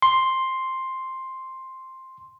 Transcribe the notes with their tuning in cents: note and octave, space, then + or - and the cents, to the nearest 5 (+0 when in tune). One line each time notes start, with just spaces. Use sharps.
C6 +5